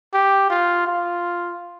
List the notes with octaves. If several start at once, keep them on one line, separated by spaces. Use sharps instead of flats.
G4
F4
F4